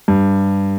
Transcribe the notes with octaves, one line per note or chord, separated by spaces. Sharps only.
G2